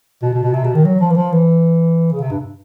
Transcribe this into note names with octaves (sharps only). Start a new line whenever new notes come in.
B2
B2
B2
C3
B2
D#3
F#3
F3
E3
F3
E3
C#3
C3
G2